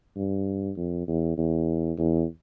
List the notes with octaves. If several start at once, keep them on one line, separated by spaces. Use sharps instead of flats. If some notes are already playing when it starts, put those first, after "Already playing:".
G2
F2
E2
E2
E2